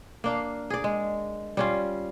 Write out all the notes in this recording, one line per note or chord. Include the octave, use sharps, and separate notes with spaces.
A#3 D4 F5
G#4 D5
G#3
G3 C#4 F4